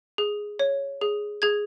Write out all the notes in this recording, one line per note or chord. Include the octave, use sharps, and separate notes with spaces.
G#4
C#5
G#4
G#4 G#6